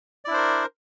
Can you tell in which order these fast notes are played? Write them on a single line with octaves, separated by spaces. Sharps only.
D5 E4 D4 C5 A#4